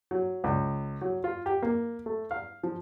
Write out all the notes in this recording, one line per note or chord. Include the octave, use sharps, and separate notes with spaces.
F#3
C#2
F#3
F4
G4
A#3
A3
F5
F3